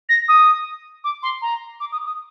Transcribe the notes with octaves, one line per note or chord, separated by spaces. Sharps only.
A#6
D#6
D6
C6
A#5
D6
D#6
D#6